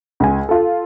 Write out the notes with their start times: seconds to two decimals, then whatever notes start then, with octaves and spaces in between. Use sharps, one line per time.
0.20 C#2 G#5
0.49 F4 A4